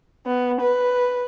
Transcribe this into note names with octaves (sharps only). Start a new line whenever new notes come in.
B3
B4